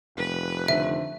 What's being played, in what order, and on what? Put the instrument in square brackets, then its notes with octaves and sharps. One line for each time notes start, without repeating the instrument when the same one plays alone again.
[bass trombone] F1 [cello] B4
[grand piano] D3 D#3 C4 [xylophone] E5